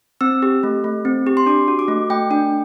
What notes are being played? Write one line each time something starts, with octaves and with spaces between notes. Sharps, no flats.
C4 E6
G4
A3
A3
C4
G4
C6
D4 D6
F#4
D6
A3
A3 G5
D4 G5